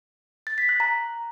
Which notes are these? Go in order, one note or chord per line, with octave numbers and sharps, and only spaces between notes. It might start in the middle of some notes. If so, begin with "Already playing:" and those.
A6
B6
F#6
A#5